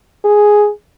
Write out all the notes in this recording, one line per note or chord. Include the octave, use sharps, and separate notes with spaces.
G#4